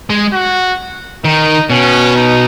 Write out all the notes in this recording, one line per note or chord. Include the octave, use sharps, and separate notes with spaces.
G#3
F#4
D#3 D#4
B2 C#4
D#4